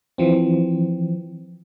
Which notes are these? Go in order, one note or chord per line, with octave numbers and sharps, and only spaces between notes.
E3 F3 C4